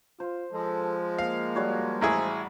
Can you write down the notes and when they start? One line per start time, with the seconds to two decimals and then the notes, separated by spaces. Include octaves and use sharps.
0.20 F4 C5
0.52 F3 G#3 A4
1.19 A#3 F5
1.56 G3 F#4 C#5
2.01 A1 E4 G#4 A#5